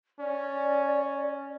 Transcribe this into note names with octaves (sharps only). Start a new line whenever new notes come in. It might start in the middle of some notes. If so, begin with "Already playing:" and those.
C#4 D5